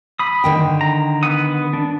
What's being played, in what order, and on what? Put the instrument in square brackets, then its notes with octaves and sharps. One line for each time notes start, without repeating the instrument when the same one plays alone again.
[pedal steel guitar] B5 D#6
[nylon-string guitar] D3 D#3 G5
[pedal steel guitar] A#5
B3 F#5 D#6
D4